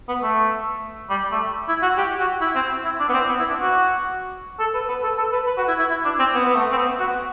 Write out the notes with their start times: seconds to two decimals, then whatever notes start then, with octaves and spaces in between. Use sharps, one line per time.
0.08 B3
0.23 A3
1.10 G3
1.32 A3
1.69 E4
1.82 F#4
1.97 G4
2.20 F#4
2.41 E4
2.55 C4
2.85 E4
3.00 D4
3.09 B3
3.14 C4
3.28 B3
3.39 E4
3.50 D4
3.61 F#4
4.59 A4
4.74 B4
4.88 B4
5.03 A4
5.18 A4
5.32 B4
5.47 B4
5.58 F#4
5.68 E4
5.79 E4
5.90 E4
6.05 D4
6.19 C4
6.34 B3
6.46 B3
6.56 A3
6.73 C4
6.78 B3
7.00 F#4